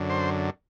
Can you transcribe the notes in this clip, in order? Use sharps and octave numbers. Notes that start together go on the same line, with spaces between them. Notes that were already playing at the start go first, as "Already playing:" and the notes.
Already playing: F#2 D3
C5